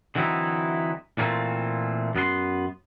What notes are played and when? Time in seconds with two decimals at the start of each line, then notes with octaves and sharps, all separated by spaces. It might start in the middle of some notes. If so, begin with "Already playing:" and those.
0.15 D3 E3 F#3 C4 D#4 E4
1.18 A#2 E3 A3 A#3 C4 F4
2.15 F#2 B3 A#4 C6